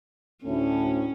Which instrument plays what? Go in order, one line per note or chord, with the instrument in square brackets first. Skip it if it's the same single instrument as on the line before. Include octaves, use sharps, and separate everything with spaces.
[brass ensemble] D2 A2 [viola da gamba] C#4